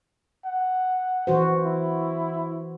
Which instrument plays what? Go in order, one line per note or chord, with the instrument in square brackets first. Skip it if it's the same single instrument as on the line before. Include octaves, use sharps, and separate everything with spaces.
[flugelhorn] F#5
[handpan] E3 F#4 C5
[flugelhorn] E4